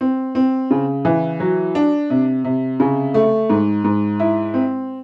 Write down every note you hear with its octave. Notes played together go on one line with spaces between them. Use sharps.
C4
C4
C#3
E3
F#3
D4
C3
C3
C#3
A3
G#2
G#2
E4
C4